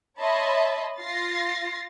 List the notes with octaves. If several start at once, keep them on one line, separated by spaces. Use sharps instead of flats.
C#5 D#5 E5 A5 B5 C6
F4 A6 A#6 C7